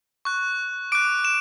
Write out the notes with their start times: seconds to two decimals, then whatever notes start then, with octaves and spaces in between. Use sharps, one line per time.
0.25 C#6 F#6
0.92 D6 F#6 D7
1.25 E7